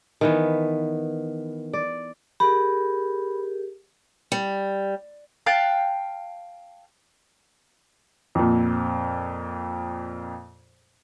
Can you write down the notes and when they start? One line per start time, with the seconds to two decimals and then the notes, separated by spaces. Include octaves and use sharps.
0.21 D#3 E3 B3
1.73 D5
2.40 G4 G#4 A#4 B5
4.32 G3
5.46 F5 G5 A5 F#6
8.35 F2 A#2